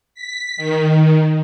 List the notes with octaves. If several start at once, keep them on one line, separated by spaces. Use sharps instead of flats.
B6
D#3